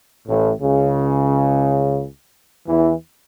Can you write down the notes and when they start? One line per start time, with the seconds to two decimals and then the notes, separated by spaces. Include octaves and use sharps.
0.28 A1 A2
0.62 C#2 C#3
2.67 E2 E3